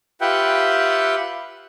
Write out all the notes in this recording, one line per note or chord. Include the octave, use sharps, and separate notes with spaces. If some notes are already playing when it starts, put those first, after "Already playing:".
F4 G4 B4 E5 F#5 G5